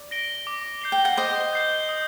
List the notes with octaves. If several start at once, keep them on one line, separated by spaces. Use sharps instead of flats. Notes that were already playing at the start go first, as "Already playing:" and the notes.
Already playing: D5
A#6 D7 G7
D6
G6 C7 G7
G5
F#5
C5 D#5 D6
G6 C7 G7
D#6